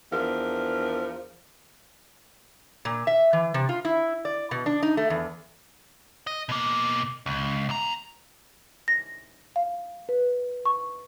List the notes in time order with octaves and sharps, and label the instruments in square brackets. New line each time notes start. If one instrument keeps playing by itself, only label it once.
[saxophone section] E2 F3 D4 A#4
[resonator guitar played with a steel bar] A#2
E5
E3
C3
F4
E4
D5
B2
D4
D#4
A3
E2
[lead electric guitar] D#5
B2 A#3
C#2
E2 A#5
[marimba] A#6
F5
B4
C#6